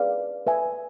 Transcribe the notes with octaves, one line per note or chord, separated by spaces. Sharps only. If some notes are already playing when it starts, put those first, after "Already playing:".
Already playing: G#4 B4 D5 F5
B4 E5 G#5